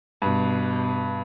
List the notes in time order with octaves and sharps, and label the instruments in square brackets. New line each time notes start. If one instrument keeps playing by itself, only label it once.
[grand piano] G2 [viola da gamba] B2